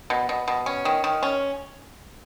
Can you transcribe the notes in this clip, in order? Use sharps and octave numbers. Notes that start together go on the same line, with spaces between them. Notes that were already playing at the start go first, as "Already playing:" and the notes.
B2
B2
B2
C#4
D#3
D#3
C#4